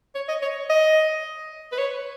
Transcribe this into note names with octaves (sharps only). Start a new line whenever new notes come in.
C#5
D#5
C#5
D#5
B4
C#5